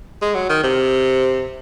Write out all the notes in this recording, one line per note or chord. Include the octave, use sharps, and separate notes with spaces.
G#3
F#3
D#3
C3